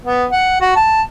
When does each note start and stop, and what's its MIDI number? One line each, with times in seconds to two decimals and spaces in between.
0.05 0.25 59
0.32 0.56 78
0.61 0.73 66
0.76 1.03 81